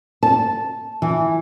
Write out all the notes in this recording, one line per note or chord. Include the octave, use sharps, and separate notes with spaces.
A5
E3